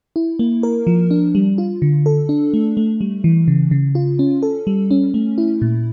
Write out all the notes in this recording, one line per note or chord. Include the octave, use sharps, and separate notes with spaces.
E4
A#3
A#4
F3
D4
G3
F4
D3
A4
D4
A3
A3
G3
E3
C#3
C#3
F4
C#4
A4
G3
C#4
A3
E4
A#2